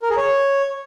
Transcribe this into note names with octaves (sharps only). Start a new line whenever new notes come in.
A#4
G#4
C#5